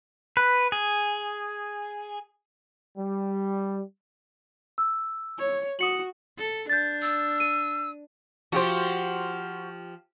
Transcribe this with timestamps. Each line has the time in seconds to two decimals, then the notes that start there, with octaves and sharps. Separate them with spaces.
0.37 B4
0.72 G#4
2.97 G3
4.78 E6
5.38 C#5
5.79 F#4 D#6 C#7 F#7
6.38 A4
6.69 D4 G6 A6
7.02 E6
7.40 D#7
8.52 F3 F#4 G4 C5